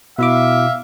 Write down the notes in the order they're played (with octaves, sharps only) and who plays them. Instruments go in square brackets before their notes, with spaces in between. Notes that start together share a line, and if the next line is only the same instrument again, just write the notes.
[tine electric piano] B2 E4 D6 [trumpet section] E5 F5